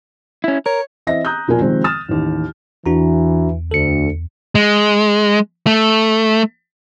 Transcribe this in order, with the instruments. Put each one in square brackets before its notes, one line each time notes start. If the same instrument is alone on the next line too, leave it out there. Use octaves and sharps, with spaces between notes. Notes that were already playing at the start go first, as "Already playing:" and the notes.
[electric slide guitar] C#4 E4
[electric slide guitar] A#4 [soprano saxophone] C#5
[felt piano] E3 C4 D#5 E5 A#6
A#5 D#6 F#6 G6
E1 A#2 F3 A#4 G#5
C3 D#3 F3 G#3 C4
D#6 F6 A6 E7
A1 D#2
[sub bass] E2 [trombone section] E3 [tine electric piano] D4 F#4 A#5
[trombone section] D2 [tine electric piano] A4 C#7
[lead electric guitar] G#3
A3